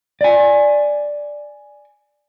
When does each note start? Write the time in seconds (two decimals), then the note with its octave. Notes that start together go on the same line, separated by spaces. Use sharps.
0.21 D5 G#5